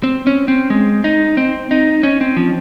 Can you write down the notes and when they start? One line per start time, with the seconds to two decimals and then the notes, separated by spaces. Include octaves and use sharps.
0.03 C4
0.27 C#4
0.48 C4
0.70 G#3
1.04 D#4
1.37 C4
1.71 D#4
2.03 C#4
2.21 C4
2.36 F3